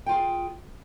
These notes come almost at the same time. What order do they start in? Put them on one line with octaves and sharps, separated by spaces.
G5 F4 G#4